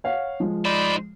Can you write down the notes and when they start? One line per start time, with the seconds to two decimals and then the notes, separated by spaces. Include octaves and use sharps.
0.04 C#5 F5 F#5
0.40 F3 G#3
0.65 D#4 C5 D5 B5